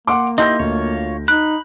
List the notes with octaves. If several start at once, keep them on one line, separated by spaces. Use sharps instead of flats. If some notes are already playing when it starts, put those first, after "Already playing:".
A#3 F#5 C6 D6
D#4 E4 G4 D#5 C6 G6 A#6
D2 F4 C#5
D#4 B5 F#6